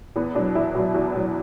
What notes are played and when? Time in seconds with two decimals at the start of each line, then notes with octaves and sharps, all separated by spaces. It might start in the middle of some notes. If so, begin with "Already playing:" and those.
0.16 E2 B3
0.35 B2 F#3 D4
0.55 E2 E4
0.75 B2 F#3
0.94 E2 F#4
1.15 B2 F#3